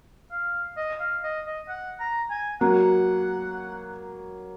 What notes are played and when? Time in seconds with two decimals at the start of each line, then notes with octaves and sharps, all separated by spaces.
0.32 F5
0.77 D#5
1.00 F5
1.24 D#5
1.46 D#5
1.69 F#5
2.00 A#5
2.31 G#5
2.61 F#3 A#3 F#5